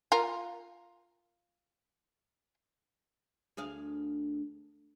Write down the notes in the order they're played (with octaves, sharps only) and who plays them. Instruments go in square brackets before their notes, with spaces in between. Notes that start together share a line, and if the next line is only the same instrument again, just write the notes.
[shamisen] F4 A#4
[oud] D2 G#4 F5